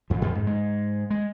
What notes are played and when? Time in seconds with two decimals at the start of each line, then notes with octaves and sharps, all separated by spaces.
0.10 F2 F3
0.22 F2
0.35 G#2
0.47 G#2 G#3
1.10 G#3